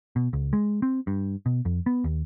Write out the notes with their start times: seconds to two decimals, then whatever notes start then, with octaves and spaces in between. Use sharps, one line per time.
0.16 B2
0.33 C#2
0.53 G#3
0.82 C4
1.07 G2
1.46 B2
1.65 F2
1.86 B3
2.04 D#2